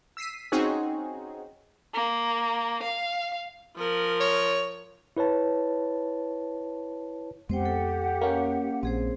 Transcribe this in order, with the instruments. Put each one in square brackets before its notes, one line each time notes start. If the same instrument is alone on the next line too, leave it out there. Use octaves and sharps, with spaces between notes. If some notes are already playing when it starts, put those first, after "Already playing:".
[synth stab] E6 B6 C7 D#7
C4 C#4 D#4 F#4 G#4
[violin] A#3
F5
[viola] F3 A#4
[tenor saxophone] C#5
[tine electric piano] E4 B4 C#5 A5
[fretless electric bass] F2 G#3 B3 [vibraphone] C4 C5 G5 [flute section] G4 F#5
[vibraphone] A4 G5
[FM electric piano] A#3 C#4 [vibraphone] F5
[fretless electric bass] A#1 [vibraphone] C4 G#4 C5